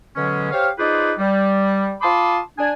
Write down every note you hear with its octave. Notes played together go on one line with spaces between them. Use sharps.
B2 D3 F#3 G#3 C#4
G4 C5 C#5 F5
D#4 F4 G#4 B4 C5 D5
G3
F4 A5 B5 C6 D6 D#6
D4 G#5